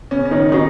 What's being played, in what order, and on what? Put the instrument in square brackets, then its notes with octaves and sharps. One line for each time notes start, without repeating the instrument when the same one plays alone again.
[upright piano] C#3 C#4
C#4
D#3 D#4
[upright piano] D#3 D#4 [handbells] C#4 F#4